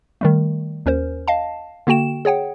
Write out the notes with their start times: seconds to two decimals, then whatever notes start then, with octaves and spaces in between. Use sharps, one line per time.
0.21 D#3 G3 A3
0.86 D#2 C#4 A#4 C5
1.28 D#5 F5 A5
1.87 D3 A#3 F#4 G5 E7
2.25 G#4 C#5 F#5 G5